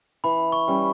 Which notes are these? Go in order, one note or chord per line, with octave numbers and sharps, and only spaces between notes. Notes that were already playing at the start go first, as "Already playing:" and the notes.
E3 B5
C#6
G3 C#4